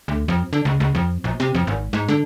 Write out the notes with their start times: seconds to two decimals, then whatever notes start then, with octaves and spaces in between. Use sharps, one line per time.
0.08 D2
0.28 F2
0.53 D3
0.65 C#2
0.80 C#2
0.95 F2
1.24 A#1
1.40 C3
1.55 F2
1.67 G#1
1.93 G#2
2.08 D3